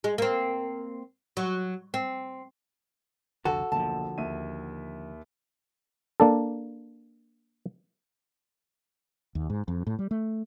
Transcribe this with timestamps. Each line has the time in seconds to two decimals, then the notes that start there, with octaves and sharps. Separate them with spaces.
0.04 G#3
0.18 A#3 C4
1.37 F#3
1.94 C4
3.45 C2 F2 D3 F#4 A4
3.72 F#1 B1 D3 F3 A5
4.18 D#2 E5 D#7
6.20 A#3 D4 A4
9.35 D#2
9.50 G#2
9.68 F2
9.87 A2
9.99 G3
10.11 A3